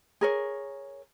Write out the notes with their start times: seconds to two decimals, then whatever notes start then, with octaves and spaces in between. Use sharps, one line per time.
0.21 G#4 A#4 C#5